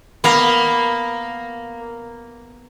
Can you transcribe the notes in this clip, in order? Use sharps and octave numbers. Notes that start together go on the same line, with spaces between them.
A#3 B3 F5 A#5